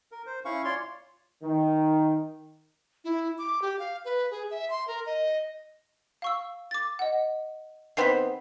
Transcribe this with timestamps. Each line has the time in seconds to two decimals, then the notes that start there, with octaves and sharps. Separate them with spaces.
0.12 A#4
0.26 C5
0.45 C#4 E4 F5 C#6
0.65 F4 C#5 D5 C6
1.43 D#3
3.05 E4
3.38 D6
3.62 G4
3.79 F5
4.05 B4
4.31 G#4
4.51 E5
4.70 C6
4.88 A#4
5.06 D#5
6.22 F5 C#6 E6
6.71 D6 A6
6.99 D#5 F#5
7.97 D#3 B3 C4 B6 C7